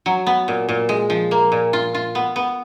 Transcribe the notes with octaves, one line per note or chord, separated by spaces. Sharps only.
F#3
B3
A#2
A#2
G#3
F3
A#3
A#2
F4
F4
B3
B3